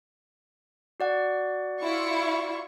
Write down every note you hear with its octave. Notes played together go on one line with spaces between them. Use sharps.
F#4 D5 F#5
E4 F4 C#6